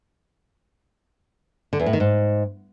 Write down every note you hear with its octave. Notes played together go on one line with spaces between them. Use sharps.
D3
E2
A2
D#3
G#2